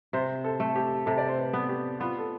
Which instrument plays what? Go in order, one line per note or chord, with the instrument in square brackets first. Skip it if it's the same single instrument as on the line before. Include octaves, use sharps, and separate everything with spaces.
[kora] C3 [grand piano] C5
[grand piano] A4
[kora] A3
[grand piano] G4
[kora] C3 [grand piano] A4
[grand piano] D5
C5
B4
[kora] B3
[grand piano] G4
[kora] B3 [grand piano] F4
[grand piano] A4